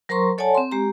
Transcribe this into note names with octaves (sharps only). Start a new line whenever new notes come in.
F#3 A#4 C5 A#5 C6 C#6
A4 C#5 D5 F#5 G#5 A5
C4 C6
G#3 G4 A#5